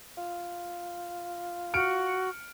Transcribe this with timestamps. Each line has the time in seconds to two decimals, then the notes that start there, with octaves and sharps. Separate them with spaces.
0.18 F4
1.74 F#4 F6 C#7 D7